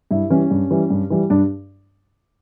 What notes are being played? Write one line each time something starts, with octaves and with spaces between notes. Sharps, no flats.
G2 E4
E3 G3 C#4
G2
E3 G3
G2
E3 G3
G2 D4